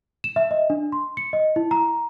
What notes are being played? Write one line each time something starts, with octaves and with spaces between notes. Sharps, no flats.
E7
E5
D#5
D4
C6
C#7
D#5
E4
A#5